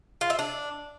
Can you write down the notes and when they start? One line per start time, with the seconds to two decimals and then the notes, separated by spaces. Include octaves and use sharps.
0.21 F4
0.30 E5
0.39 D4